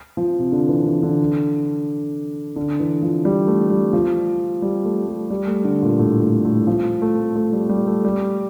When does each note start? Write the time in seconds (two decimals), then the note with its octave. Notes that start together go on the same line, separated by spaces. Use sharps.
0.17 F3
0.39 C3
0.52 D3
0.68 E3
0.86 E3
1.03 D3
2.56 D3
2.80 E3
3.02 F3
3.25 G3
3.48 A3
3.70 G3
3.93 F3
4.62 G3
4.84 A3
5.07 G3
5.30 G3
5.47 A3
5.64 D3
5.82 A#2
5.99 A2
6.22 A2
6.45 A2
6.67 F3
7.02 A3
7.35 A3
7.53 G3
7.69 G3
7.87 A3
8.05 G3